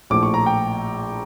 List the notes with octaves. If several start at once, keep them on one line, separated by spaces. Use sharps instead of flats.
A#1 A2 F3 D6
C#6
A#5
G5